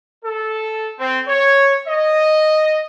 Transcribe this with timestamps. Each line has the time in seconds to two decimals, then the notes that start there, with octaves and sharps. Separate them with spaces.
0.23 A4
0.99 C4
1.28 C#5
1.87 D#5